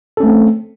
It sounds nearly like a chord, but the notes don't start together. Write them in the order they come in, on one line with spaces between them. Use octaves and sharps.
A4 C#4 A3 C4